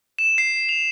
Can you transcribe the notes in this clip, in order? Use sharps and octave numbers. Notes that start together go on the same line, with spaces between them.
E7
C7
F7